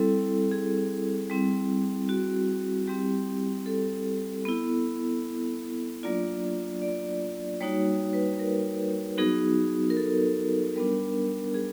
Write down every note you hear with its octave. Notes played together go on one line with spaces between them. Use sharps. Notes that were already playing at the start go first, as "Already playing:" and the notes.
Already playing: G3 C4 E4 A4
G#4
G3 C4 E4
F#4
G3 C4 E4 G4
A4
B3 E4
F#3 A#3 D4 F4 D5
D5
G3 A#3 D#4 F#4 C#5
C#5
B4
A#4
F#3 B3 D#4 F#4 G#4
A#4
A4
G3 B3 D4 A#4
G#4